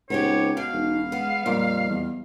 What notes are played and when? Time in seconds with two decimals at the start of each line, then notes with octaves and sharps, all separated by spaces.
0.10 C#2 B3 C4 D#4 G4 C#5
0.57 B2 F5
0.72 E1 D#4
1.12 G#3 B3
1.46 F2 A#2 G3
1.90 E2